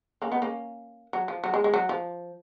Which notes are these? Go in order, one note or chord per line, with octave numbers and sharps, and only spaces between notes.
A#3 C#4
B3 D#4
A#3 C#4
F#3
F3
F#3
G#3
G#3
F#3
F3